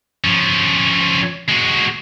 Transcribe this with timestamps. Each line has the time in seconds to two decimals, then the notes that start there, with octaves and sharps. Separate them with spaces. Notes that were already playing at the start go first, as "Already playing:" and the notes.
0.24 F3 C#4
1.49 G#3 F#4